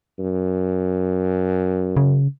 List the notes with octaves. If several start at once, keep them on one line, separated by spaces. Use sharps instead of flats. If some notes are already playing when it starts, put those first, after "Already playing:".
F#2
C#3